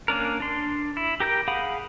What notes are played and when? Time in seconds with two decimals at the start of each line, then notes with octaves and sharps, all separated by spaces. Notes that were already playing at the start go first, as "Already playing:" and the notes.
0.08 A#3 C#4 D4 A#4
0.40 D4 C6
0.97 E4
1.20 G4 A#4 G5 G6
1.48 G#4 F5 F#5 B5